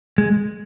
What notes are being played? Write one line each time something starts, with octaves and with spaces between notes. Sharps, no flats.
G#3